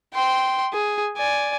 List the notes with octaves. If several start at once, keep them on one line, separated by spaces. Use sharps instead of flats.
G5 C6
G#4
D5 G#5